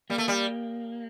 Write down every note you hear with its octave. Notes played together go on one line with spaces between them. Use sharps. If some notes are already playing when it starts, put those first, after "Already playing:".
G3 A#3
A3
G3